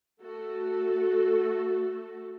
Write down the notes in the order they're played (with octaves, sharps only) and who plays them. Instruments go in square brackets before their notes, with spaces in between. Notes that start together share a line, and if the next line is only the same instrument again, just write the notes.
[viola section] A3 F#4 A4